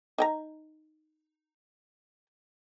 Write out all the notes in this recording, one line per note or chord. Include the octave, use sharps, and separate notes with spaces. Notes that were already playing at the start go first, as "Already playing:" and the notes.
D#4 G5 A#5